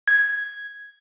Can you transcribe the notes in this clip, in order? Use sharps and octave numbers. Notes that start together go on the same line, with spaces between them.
G#6